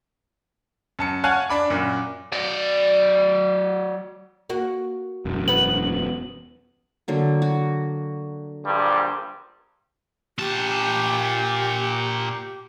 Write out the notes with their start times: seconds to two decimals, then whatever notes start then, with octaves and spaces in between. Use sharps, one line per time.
0.99 F#2 A5 C#7
1.24 C#5 F5 F#5 G#5 A5 F#6
1.49 D4 B5 D6
1.70 F#2 A#2
2.32 F#3 D5
4.50 A#3 F#4
5.25 E1 F#2
5.48 B3 B4 F#7
7.08 D3 F#3 A#3
7.42 F#4
8.65 A#1 G2 G3
10.38 A#2 G4 A5